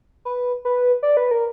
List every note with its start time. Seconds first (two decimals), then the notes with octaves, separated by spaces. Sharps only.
0.25 B4
0.65 B4
1.03 D5
1.17 B4
1.31 A#4